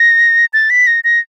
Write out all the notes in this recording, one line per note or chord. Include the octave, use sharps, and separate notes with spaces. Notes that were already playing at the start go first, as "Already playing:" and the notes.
Already playing: A#6
A6
B6
A#6
A#6